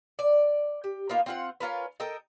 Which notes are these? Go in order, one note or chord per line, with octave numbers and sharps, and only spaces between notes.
D5
G4
A#3 B3 D#4 F4
C4 F4 F#5
C#4 F4 A#4 B4
A4 A#4 D#5 G5